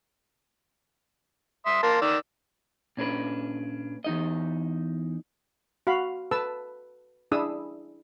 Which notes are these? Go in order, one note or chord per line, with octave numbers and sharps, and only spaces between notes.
E5 C6 D#6
A#3 A5 C6
D#3 D5 E6
A#2 C#4 D4 B4
E2 D#4 D#5
F#4 F5 B5
A4 B4 A5 E6
D4 E4 G#4 D#6 E6